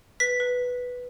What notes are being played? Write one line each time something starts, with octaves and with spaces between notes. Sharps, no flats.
B4 B6
B4